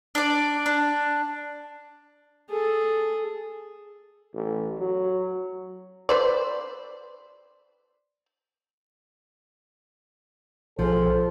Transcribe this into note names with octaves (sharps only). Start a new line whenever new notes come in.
D4 D5
D4
G#4 A4
A1
F#3
B4 C5 D5
B1 F3 G#4 A4 C5